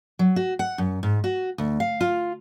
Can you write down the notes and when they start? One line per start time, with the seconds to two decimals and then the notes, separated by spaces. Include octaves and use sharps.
0.19 F#3
0.36 F#4
0.59 F#5
0.78 F#2
1.03 G#2
1.24 F#4
1.58 D2
1.80 F5
2.01 F4